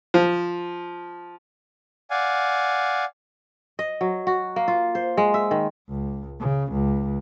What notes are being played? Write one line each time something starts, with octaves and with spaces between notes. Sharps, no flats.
F3
D5 F5 F#5 G#5
D#5
F#3
F#4
A#3
F4
C5
G#3
E5
D#3
C#2
C#3
C#2